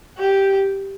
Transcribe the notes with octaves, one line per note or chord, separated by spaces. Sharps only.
G4